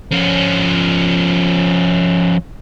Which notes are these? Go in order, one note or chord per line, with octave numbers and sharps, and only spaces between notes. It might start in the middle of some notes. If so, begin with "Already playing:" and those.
F3 C#4